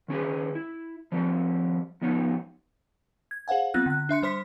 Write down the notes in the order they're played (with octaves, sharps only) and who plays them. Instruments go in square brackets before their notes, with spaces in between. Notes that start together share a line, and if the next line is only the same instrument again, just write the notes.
[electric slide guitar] D#3 C#4 G#4 B4
E4
F3 G3 C4
F3 B3 C#4 D#4
[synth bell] G#6
G#4 C5 F5 F#5 G#5
F#3 B3 C4 F4 F#6
D3 F#6
D4 E5 C6 C#7
G3 C5 C6 B6